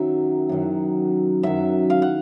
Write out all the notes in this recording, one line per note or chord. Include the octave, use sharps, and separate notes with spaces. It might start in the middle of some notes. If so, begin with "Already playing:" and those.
Already playing: F#2 D#3 F#3 E5
F#2 D#3 F#3
F#2 D#3 F#3 E5
F5
F#5